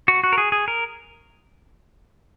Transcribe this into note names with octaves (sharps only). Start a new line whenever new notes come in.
F#4
F#4
A#4
G#4
G#4
A#4